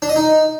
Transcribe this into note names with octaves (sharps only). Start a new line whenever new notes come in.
D4
D#5
D#4